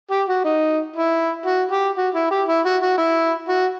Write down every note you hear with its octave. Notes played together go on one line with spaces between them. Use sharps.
G4
F#4
D#4
E4
F#4
G4
F#4
E4
G4
E4
F#4
F#4
E4
F#4